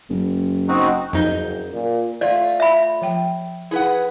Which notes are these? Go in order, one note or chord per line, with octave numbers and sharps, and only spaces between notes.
F#1
C4 D#4 F#4
F#1 F2 D#4 G6
A#2
A3 F4 D5
E5 B5
F3 G5
E4 G#4 B4 F#5